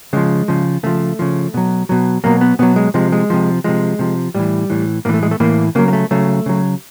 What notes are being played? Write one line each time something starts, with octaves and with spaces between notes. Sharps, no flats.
C#3 F3 G#3
C#3 F3
C#3 F3 A3
C#3 F3
B2 F#3
B2 F#3
B2 F#3 A#3
B3
B2 F#3 B3
G#3
C3 F3 G#3
G#3
C3 F3
C3 F3 G#3
C3 F3
A2 E3 G3
A2 E3
A2 E3 A#3
A3
G#3
A3
A2 E3 A#3
C#3 F#3 A#3
A#3
A3
C#3 F#3 A3
C#3 F#3